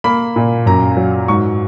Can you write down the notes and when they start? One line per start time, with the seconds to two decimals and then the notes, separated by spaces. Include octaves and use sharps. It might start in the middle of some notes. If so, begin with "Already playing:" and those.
0.04 A#3 B5
0.36 A#2
0.66 F#2 A#5
0.97 F#3
1.28 G#2 C#6